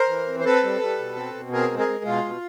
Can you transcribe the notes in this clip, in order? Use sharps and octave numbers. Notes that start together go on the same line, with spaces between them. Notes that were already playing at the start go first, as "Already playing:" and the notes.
Already playing: A#4 C5
E3
C4
C5
C4 A4 B4
G3
G3
B2
C4
B2
C4 G#4 A#4
G#3
G#4 A#4
G#3
B2 F4
B2